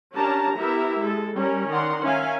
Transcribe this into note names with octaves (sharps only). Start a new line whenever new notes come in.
C#4 D4 G4 A#4 A5 A#5
B3 E4 G4 A#4 E5
G#3 A4
G3 C#4 A#4
D#3 A#4 D5 F#5 C6
C#4 A#4 E5 F5 G#5